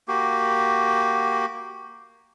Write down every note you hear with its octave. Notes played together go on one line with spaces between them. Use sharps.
A#3 F#4 G4